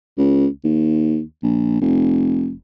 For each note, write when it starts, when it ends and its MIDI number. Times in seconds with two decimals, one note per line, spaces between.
0.18 0.47 37
0.64 1.21 39
1.43 1.79 34
1.81 2.53 29